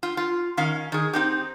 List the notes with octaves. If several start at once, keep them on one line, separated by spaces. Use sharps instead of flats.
F4
F4
D#3 C#4 F5
D#3 G#4
C4 D#4 G4